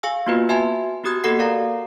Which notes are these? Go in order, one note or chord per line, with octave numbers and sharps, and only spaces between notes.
G#4 F5 G#5 E6
A#3 B3 F4 F#4 B4
F#4 E5 G#5 A5 C6
B3 F#4 G4 D#6 F#6 G#6
A#3 F#4 G4 A4 F#5 C7
A#4 D5 F5 A#5